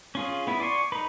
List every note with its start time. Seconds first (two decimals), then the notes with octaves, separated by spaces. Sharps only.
0.15 C#4 F4 G#4
0.47 B3 E4
0.60 D5 G#5 C6 C#6
0.92 D#4 B4 B5